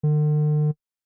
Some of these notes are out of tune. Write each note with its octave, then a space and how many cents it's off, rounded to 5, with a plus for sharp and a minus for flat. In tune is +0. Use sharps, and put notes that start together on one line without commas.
D3 +45